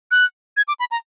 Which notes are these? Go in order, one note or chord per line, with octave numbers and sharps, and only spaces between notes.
F#6
G#6
D6
B5
A#5